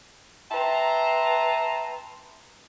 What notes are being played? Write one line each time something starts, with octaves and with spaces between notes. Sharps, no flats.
B4 E5 G5 A5 A#5 C6